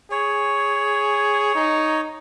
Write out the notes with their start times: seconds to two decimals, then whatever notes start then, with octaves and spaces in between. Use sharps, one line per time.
0.11 G#4 C#5
1.55 D#4